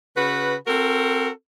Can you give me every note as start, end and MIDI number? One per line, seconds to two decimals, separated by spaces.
0.16 0.55 49
0.16 0.55 66
0.16 0.55 71
0.67 1.29 60
0.67 1.29 66
0.67 1.29 69
0.67 1.29 70